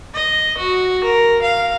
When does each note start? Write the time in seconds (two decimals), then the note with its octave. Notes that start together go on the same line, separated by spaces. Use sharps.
0.13 D#5
0.57 F#4
1.04 A#4
1.42 F5